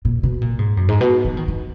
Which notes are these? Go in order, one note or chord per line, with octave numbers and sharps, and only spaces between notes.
A#2
B2
A#2
G#2
F#2
G#2
B2
F3
D#3
D#3